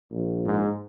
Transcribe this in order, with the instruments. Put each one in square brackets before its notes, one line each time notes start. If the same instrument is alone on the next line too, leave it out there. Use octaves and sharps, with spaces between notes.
[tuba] A#1
[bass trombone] G#2